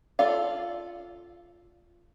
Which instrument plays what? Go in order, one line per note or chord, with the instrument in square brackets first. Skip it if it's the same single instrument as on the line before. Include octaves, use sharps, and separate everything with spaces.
[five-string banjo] F4 A4 D5 F5